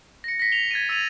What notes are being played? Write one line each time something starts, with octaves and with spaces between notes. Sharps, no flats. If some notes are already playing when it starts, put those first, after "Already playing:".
A#6 C#7
A#6 B6
F7 G7
G#6 A6 B6 D#7
E6 G#6 A6 D#7 F7